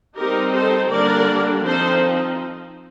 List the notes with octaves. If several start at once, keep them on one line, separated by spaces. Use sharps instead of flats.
G3 C4 D#4 G4 A#4
A4 C5
D3 G3 A#3 D4 A#4 D5
F3 C4 D#4 A4 C5